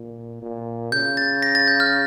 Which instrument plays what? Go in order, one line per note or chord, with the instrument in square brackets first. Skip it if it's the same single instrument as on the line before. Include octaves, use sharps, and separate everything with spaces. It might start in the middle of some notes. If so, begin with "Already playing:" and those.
Already playing: [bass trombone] A#2
A#2
[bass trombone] C#3 [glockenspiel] G6
[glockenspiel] A6
A#6
A6
G6
F6